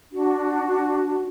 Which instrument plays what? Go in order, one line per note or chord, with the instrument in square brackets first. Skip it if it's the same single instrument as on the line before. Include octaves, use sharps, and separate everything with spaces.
[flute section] D4 F#4